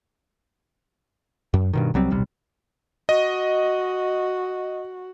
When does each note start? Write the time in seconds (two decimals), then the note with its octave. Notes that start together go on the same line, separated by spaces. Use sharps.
1.54 F#2
1.73 G2 B2 D#3
1.94 C2 F#3 G3 C4
2.10 D#1 B1 C3 G3
3.09 F#4 D#5